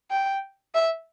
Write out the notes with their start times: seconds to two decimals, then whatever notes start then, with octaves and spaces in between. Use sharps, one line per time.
0.11 G5
0.74 E5